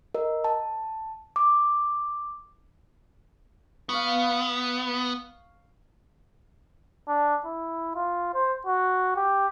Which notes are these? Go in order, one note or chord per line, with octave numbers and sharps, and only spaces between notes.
A#4 D#5
A5
D6
B3 F5 C#6
D4
E4
F4
C5
F#4
G4